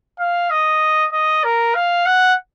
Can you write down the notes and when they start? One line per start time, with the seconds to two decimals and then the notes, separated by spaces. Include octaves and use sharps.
0.19 F5
0.50 D#5
1.13 D#5
1.44 A#4
1.75 F5
2.06 F#5